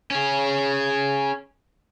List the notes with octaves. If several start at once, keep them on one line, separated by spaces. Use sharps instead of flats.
C#4 G#4